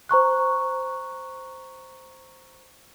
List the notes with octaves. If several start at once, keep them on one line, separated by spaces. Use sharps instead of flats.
C5 A#5 C#6 F#6